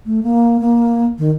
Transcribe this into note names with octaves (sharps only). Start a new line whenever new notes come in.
A3
A#3
A#3
D#3